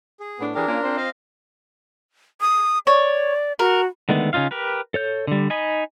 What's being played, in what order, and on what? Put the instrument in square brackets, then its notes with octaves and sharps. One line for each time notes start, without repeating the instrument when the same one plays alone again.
[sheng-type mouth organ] G#4
[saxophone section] A2 B3 D4
[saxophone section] E3 G4 G#4 [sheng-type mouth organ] D4 A#4
[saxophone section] A#3 C#4 F4
C4 F4 C5
[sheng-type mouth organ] D#5 F5
[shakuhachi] D#6
[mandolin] C#5 [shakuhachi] D5
[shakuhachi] F#4 [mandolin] A#4
[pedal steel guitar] D3 D#3 G#3 A3 B3
C#3 C#4 D#4 F4 F5
G4 A#4 B4
A4 C#5 G6
D3 G3
D#4 D#5 G#5 B5